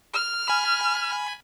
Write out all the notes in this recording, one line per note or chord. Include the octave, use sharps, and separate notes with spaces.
F6
G#5 B5